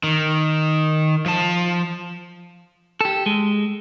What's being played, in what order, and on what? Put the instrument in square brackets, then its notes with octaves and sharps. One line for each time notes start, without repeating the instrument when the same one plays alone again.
[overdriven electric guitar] D#3
F3 A5
[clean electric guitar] G4 A4
G#3